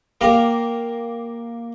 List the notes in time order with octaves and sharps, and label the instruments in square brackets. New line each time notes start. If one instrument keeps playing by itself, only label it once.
[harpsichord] A#3 G4 A#4 F5